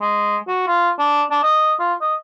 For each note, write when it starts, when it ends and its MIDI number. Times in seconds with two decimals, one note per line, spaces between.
0.01 0.37 56
0.48 0.67 66
0.67 0.90 65
0.99 1.23 62
1.31 1.39 62
1.43 1.74 75
1.80 1.94 65
2.01 2.16 75